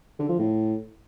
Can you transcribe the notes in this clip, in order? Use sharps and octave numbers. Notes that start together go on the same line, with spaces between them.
D3
F3
A2